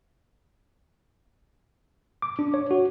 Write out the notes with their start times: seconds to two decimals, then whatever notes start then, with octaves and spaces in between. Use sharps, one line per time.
2.22 D6
2.39 D4
2.54 C#5
2.71 F#4